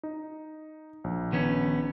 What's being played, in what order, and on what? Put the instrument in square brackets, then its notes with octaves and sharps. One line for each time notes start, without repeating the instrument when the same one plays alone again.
[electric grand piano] D#4
A#1
[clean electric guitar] D#3 B3 C#4